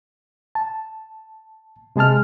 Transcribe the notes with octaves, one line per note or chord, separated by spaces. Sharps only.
A5
C3 G#3 G#4 A5 F6